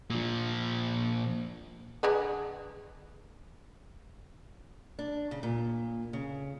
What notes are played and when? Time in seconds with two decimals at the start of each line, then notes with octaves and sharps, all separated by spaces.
0.10 A#2 F3
2.03 D3 G#4 B4
4.99 D4
5.31 C#3
5.43 A#2
6.13 C#3